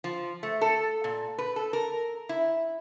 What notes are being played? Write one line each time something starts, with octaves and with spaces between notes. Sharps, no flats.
F3
A3
A4
A#2
B4
A4
A#4
E4